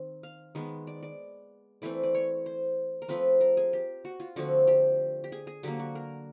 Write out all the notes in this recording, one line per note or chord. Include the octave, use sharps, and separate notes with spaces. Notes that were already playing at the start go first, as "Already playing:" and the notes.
Already playing: D#3 C4
F5
D#3 G#3 B3
D5
D5
E3 A3 C4 D5
D5
C#5
C5
A#4
F3 A3 C4 B4
A#4
G#4
G4
F#4
F4
D3 F3 A3 C4 F#4
G4
G4
G#4
G#4
D3 F#3 A#3 G4
F#4
A#4